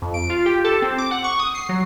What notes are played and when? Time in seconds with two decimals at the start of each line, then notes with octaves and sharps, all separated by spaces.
0.02 F2
0.14 D7
0.30 F4
0.46 G4
0.64 A4
0.82 C4
0.98 D6
1.11 F#5
1.24 C#6
1.39 D#6
1.55 C7
1.69 F#3